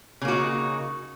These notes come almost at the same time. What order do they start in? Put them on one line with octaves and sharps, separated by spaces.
C#3 A#3 F#4 D#4